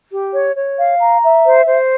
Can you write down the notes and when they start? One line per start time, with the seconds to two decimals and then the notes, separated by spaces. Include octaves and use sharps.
0.11 G4
0.33 C#5
0.55 C#5
0.78 F5
0.99 A#5
1.22 E5
1.44 C5
1.66 C5